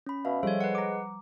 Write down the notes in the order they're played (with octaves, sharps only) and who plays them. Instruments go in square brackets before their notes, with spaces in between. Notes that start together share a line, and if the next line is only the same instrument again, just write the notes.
[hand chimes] C#4 B5
[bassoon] B2 [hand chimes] E5 F5
[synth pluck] F3 G3 [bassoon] G#3 [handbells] A4 C#5 [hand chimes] C5
[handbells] B4 F#5
[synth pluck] A#5 D6